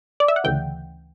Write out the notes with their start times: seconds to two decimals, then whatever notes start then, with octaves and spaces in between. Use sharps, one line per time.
0.20 D5
0.28 E5
0.36 F#5
0.44 D2 C#3 E3 G5